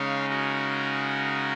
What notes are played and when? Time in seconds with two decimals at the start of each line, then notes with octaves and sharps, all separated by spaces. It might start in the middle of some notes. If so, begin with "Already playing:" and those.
Already playing: C#3 G#3 D#4 C#5 F5
0.30 F#4 A#4